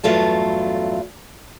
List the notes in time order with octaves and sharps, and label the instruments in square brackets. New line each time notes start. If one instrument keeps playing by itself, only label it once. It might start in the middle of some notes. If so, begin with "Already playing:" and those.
[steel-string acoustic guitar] E2 G2 F#3 A3 F4 A5